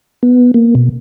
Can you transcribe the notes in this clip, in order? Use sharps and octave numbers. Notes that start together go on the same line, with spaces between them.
B3
A#3
B2